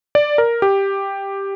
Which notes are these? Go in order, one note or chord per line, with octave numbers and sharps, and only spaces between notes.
D5
A#4
G4